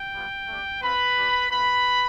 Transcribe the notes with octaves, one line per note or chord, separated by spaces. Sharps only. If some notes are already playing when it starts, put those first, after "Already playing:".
Already playing: G5
G3 B3 F4
A3 D4 G4
C4 F4 B4 B5
G3 D4 G4
A3 C4 F4 B4 B5